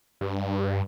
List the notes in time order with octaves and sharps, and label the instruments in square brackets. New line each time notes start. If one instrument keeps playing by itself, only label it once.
[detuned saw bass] G2